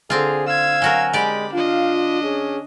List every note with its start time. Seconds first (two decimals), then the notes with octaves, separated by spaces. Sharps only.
0.10 D3 C4 F4 G#4
0.47 F5 E6 G#6
0.82 F#3 F#4 A#4 G#5
1.13 G#3 G4 D5 B5
1.53 D4 F4 D#5 F5
2.23 C#4 G#4